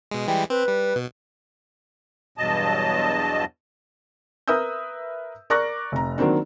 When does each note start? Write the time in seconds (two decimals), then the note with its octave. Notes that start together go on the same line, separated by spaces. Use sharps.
0.11 B2 G#3
0.27 E3 G3 G#3 G5
0.50 C4 B4
0.68 G3
0.96 B2
2.38 E2 G2 B2 F#3 D#5 A5
4.48 A#4 B4 E5 D#6 E6 G6
5.50 A#4 D5 C#6 D6 F#6 A#6
5.92 F1 A#5
6.18 D#3 F#3 A#3 C4 D4